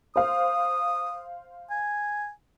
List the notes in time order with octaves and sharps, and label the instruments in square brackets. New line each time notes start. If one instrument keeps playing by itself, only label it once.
[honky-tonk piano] C5 F5 [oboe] D#6
[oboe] G#5